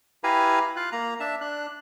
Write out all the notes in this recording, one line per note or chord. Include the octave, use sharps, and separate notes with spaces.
E4 G4 B4 F5 G#5 A#5
F4 F5 F#6
A#3 A#5
D4 E5 A5
D4 F#6